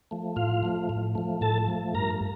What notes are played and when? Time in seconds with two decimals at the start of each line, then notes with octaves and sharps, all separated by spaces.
0.11 F3 A3
0.36 A2 F4 F5
0.63 F3 A3
0.89 A2
1.15 F3 A3
1.41 A2 A4 A5
1.68 F3 A3
1.94 G2 A#4 A#5